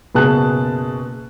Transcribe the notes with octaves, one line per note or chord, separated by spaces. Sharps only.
F#1 B2 G#4 A5 F#6